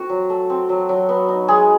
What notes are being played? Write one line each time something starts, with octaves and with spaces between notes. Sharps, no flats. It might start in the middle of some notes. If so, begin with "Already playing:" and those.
Already playing: A3 C4 F#4
F#3
A3
C4
F#3
F#3
B3
D#4
G#3 G#4